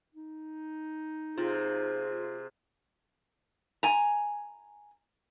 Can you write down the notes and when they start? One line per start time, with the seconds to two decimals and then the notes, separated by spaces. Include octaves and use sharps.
0.14 D#4
1.38 C3 F4 G#4
3.83 G#5 A#5